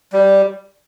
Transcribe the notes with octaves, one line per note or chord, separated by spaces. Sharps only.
G3